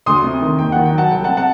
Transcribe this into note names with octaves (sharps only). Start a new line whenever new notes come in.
D2 C6 D#6
C3
D#3
D#2 G5
D#3 F#5
G5
F#3 F#5 A5
C2 G5
F#5 A5
C3
F#5 A5